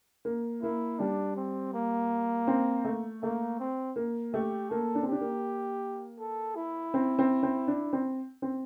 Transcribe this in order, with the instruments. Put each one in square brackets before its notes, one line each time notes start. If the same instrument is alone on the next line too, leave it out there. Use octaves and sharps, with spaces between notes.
[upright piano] A#3
[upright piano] A#3 [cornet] E4
[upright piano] G3 [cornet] D4
[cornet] C4
A#3
[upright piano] C4
A3
[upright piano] A3 [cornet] A#3
[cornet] C4
[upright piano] A#3
[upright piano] A3 [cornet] G4
[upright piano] A#3 [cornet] A4
[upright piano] D4
C4
[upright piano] D4 [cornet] G4
[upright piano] A#3
[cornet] A4
E4
[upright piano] C4
C4
C4
D4
C4
C4